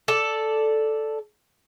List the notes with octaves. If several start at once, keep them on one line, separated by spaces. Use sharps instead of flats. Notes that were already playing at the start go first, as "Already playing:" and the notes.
A4 D5